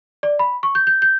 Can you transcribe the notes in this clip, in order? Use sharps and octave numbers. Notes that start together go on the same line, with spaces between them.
D5
B5
C#6
G6
G6
G6